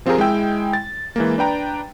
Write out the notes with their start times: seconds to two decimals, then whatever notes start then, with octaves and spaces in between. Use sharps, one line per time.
0.06 F3 C4 F4 G4 G#4 A#4
0.18 G#3 E4 G5 E6
0.73 A6
1.16 E3 G#3 A#3
1.38 D4 B4 G5 A#5